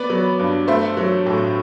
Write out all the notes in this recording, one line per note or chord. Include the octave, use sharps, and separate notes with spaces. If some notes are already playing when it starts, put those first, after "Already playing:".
Already playing: B3 B4 D5
F#3
G2
A3 C5 E5
F#3
A2